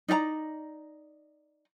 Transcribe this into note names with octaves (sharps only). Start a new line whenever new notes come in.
D#4 D5 E5 A#5